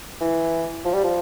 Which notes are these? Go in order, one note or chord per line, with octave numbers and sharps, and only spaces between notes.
E3
F3
G3
F3